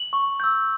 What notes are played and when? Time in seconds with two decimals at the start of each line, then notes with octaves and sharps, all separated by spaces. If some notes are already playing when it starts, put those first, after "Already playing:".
Already playing: F#7
0.13 C#6
0.40 E6 G6